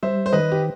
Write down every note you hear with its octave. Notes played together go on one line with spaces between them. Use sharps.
G3 C5 E5
C5
D#3 B4 D#5
G4